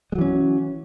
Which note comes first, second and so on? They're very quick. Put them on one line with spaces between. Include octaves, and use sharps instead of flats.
G#3 F#3 E3 C#4